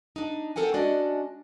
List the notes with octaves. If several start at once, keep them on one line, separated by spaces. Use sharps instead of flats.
D4 D#4
C#3 C4 A4 A#4 F#5 G#5
G#3 C#4 D4 F#4 D5 D#5